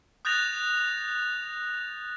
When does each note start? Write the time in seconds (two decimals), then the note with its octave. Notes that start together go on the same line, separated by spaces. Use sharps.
0.25 D#6 F#6 G6 A6 A#6 F7